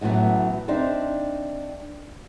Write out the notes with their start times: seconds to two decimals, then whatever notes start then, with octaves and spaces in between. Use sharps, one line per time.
0.01 F#2 A2 E3 F#3 B3
0.68 C4 D4 D#4 C5 E5